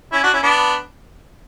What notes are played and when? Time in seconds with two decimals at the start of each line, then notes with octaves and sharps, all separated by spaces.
0.13 C#4 E4
0.23 D4 F#4
0.33 C#4 E4
0.43 B3 D4